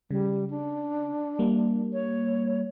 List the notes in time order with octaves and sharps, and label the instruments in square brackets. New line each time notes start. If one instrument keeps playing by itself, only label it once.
[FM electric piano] C#3 [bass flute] G3
[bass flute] D4
[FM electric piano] G3 A#3
[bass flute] C#5